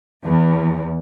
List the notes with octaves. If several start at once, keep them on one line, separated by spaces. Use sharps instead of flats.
E2